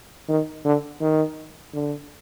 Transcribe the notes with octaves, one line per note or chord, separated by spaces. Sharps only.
D#3
D3
D#3
D3